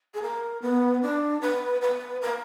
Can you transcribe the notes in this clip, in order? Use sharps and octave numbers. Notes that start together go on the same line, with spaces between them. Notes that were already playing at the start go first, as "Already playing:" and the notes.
G#4
A#4
B3
D4
B4
B4
A#4